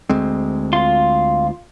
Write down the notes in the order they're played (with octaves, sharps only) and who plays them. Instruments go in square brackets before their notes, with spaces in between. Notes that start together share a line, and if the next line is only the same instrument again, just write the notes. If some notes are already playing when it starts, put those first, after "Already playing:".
[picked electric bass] D2 G#3 C4
[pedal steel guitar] F4 C6